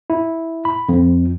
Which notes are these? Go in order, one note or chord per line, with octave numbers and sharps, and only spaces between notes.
E4
B5
F2